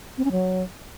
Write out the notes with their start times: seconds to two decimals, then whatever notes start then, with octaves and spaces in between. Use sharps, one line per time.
0.18 C4
0.25 C#4
0.31 F#3